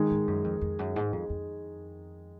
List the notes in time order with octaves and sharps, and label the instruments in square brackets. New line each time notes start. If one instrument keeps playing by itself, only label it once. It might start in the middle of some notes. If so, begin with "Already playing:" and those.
Already playing: [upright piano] D#3 G#3 D#4 G#4
[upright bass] G#2
F#2
F2
F2
F#2
G#2
F2
F2